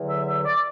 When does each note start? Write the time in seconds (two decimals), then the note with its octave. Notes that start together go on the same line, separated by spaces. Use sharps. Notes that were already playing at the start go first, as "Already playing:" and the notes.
Already playing: E2 D3 F#3
0.10 E5
0.27 E5
0.45 D5